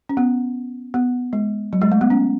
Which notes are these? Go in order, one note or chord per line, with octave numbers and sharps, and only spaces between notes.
C#4
B3
B3
G#3
F#3
G#3
A3
B3
C#4